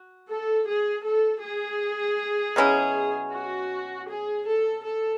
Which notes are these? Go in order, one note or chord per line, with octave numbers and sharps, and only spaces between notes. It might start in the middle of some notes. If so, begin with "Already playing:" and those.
Already playing: F#4
A4
G#4
A4
G#4
B2 F#3 C#4 E4
F#4
G#4
A4
A4